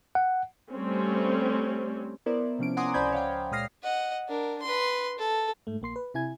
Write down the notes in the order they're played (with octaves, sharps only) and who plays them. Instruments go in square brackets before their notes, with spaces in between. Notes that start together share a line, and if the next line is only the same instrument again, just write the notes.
[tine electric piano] F#5
[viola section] G3 A3 C4 C#4
[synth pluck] B3 E4 A#4 C5 D5
C3 F3 C#4 D7
F#5 G#5 A#5 C6 D6 D#6
C#2 C5 D5 B5 G6 G#6
C#5 F5 G5
A#2 G#3 D#6 F6 A#6 C7
[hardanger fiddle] D#5 F#5
D4 A#4
B4 C6
A4
[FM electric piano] G#2 A3
A#1 A#3 C6 C7
B4
C3 E4 G#5 G#6